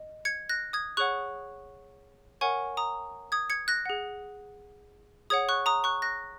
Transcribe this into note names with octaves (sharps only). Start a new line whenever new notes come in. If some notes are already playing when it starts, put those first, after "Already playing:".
Already playing: D#5
G#6 C#7
F#6 A#6
D#6 G#6
G#4 C#5 F#5 C#6 F#6
A#4 C#5 F#5 G#5 C#6
A#5 D#6
D#6 G#6
G#6 C#7
F#6 A#6
G#4 F#5
G#4 C#5 F#5 D#6 G#6
C#6 F#6
A#5 D#6
C#6 F#6
F#6 A#6